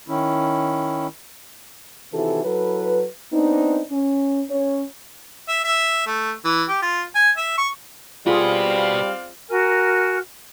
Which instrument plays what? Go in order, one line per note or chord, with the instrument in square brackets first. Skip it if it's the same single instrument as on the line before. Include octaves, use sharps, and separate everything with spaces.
[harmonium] D#3 C#4 E4
[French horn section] C3 D#3 E3 E4 F#4 A4
F#3 E4 A4 B4
B3 C4 D4 D#4
C#4
C#4 C#5
[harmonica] E5
E5
A3
E3
G4
F4
G#5
E5
C#6
[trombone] G3 [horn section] C4 D5 F5 [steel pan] F4 G#4 [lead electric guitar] F#4 B4
[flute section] F#4 A#4 G#5 F6